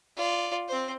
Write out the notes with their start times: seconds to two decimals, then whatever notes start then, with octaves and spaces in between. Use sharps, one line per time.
0.16 F4 D5
0.68 C4 C5